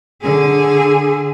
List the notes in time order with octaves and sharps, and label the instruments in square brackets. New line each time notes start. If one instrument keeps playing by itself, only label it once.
[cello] D3 G#4